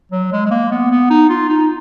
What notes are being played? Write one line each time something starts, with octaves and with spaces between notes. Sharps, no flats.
F#3
G#3
G#3
A#3
B3
B3
D#4
F4
D#4